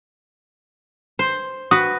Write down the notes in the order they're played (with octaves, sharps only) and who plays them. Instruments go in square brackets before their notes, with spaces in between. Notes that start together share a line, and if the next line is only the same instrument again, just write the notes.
[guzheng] C5
[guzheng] F#4 B4 [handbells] D#6